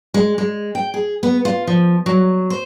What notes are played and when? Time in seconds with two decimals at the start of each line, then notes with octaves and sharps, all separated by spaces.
0.14 G#3
0.38 G#3
0.75 G5
0.94 G#4
1.23 B3
1.45 F4
1.67 F3
2.06 F#3
2.50 C5